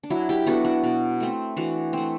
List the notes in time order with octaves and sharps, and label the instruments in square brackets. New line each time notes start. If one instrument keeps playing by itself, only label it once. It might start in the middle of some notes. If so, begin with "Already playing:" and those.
[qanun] D4
F#3 E4
E4 G4
B3 D4 F#4 A4
D4 F#4
B2
A3 C4
E3 D4 F#4
A3 C4